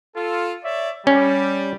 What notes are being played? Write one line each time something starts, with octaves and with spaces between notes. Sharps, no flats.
F4 A4
C#5 D5 E5
G3 C#4